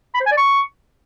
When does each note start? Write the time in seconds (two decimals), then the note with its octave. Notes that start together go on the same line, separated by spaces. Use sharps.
0.15 B5
0.20 C5
0.26 G#5
0.32 D5
0.37 C#6